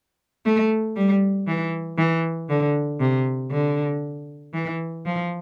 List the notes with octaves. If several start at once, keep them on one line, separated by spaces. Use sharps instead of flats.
A3
G3
E3
E3
D3
C3
D3
E3
F3